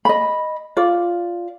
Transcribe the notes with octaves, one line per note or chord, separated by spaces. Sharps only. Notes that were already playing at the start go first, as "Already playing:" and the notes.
D#5 B5
F4 D5